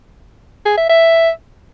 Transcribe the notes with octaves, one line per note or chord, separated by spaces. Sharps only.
G#4
E5
E5